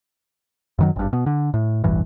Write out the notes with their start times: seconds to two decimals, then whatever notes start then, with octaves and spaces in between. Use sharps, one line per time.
0.79 F#2 D#3 F#3
0.96 G#1 G2
1.13 B2
1.26 D3
1.54 A2
1.84 E1 A1 G2 E3